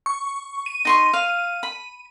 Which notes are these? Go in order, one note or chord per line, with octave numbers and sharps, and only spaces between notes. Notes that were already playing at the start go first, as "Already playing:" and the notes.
C#6
D#7
D#4 C6 C#6
F5
B5